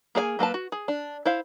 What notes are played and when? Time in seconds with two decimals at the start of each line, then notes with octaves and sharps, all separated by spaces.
0.15 A#3 G#4 D5 G#5
0.39 F#3 A#3 B4 A5
0.54 F#4
0.72 G#4
0.88 D4
1.26 E4 C5 F5